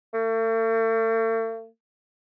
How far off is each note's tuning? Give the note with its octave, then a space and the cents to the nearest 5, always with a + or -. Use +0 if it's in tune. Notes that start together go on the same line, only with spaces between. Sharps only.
A3 +45